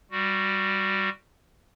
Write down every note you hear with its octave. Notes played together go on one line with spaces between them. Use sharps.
G3 F#4